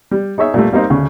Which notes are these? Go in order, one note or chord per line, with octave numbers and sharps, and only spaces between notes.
G3
D#4 G#4 C#5 E5
A#2 G3 A3
G3 A#3 C4 D#4
D2 C#3